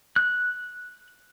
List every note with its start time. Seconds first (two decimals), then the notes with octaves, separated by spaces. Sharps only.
0.16 F#6